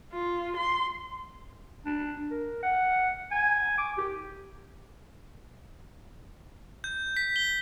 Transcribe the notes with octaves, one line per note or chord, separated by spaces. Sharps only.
F4
C6
D4
A#4
F#5
G#5
D6
G4
G6
B6
G7